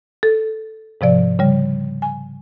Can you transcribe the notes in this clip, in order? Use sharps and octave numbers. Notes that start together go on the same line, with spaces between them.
A4
G#2 C3 F3 D5
C#3 G3
G#5